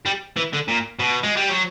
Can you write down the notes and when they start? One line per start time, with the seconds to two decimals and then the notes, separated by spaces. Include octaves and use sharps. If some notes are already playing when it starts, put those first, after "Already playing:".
0.06 G3
0.37 E3
0.53 D3
0.68 A#2
0.99 B2
1.23 G#3
1.37 G3
1.49 F#3